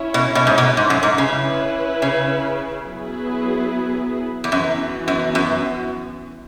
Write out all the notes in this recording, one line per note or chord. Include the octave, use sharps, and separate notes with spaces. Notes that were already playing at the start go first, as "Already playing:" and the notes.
Already playing: C#4 E4 C#5
B2
B2
G#2
B2
G#2
F#2
G#2
C#3 C#4 E4 B4
C#3
F#3 B3 E4 G#4 B4
E2
F#2 E3 B3 F#4
F#2
F#2